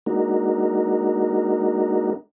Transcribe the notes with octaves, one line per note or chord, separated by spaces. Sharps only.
G#3 A#3 D4 D#4 F#4 A#4